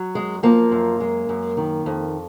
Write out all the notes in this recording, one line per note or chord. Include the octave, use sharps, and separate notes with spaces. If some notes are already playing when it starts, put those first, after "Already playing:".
Already playing: F#3
F#2 G#3
F3 A#3
F#2
G#3
F#2
D#3
F2